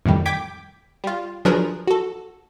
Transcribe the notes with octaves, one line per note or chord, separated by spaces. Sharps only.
F2 A2 D#3 G3
G5 D6 G#6 B6 D7
G3 F4
F3 F#3 D4 G#4 A#4 B4
F#4 A4